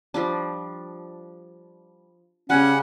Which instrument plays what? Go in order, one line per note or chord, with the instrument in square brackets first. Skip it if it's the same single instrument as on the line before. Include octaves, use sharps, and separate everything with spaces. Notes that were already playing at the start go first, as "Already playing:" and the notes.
[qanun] F3 G3 D4
[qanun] C#3 G3 [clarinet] C#4 [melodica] F#5